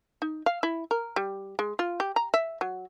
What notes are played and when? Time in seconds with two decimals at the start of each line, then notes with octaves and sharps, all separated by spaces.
0.22 D#4
0.46 F5
0.63 E4
0.91 A#4
1.16 G3
1.59 G#3
1.79 F4
2.00 G4
2.16 A#5
2.34 E5
2.61 F#3